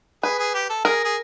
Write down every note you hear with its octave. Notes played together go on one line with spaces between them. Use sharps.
G#4 B4
G#4
G4
A4
G#4 A#4
G#4